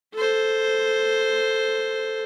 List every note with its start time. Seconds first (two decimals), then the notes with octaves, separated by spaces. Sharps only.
0.15 A4 C5